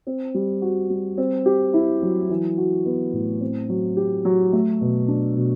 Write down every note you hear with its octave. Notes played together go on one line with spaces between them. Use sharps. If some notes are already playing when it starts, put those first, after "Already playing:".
C4
G3
F#4
G3
C4
G4
E4
F#3
E3
F#4
B3
A2
C4
F#3
G4
F#3
A3
B2
D4
B2